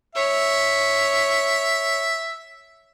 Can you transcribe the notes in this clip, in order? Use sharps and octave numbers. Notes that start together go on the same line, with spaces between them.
C#5 E5